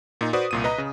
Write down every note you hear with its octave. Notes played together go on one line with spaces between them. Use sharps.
A#2 D#4
F#4 B4 C5 D5 D#6
C2 A#2 D#7
B4 D#5 A#5
C#3